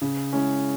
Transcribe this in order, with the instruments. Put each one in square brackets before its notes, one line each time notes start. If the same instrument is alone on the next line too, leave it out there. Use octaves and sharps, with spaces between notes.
[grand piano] C#3
G#3 C#4 E4